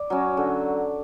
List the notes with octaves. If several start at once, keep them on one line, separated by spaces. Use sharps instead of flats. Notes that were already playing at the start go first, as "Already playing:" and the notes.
Already playing: D5
F#3 C#4
D3